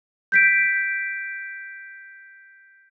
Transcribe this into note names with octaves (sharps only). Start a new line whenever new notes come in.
G6 B6 D7